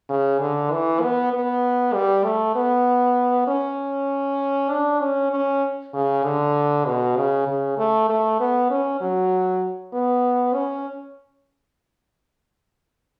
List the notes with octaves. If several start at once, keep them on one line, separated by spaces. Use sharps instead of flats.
C#3
D3
E3
B3
B3
G3
A3
B3
C#4
D4
C#4
C#4
C#3
D3
B2
C#3
C#3
A3
A3
B3
C#4
F#3
B3
C#4